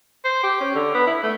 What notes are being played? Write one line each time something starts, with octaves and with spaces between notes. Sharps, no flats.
C5
G4
C#4
D3
B3
E4
A3